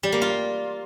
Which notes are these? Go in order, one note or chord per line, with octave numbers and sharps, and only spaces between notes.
G3
A#3
F4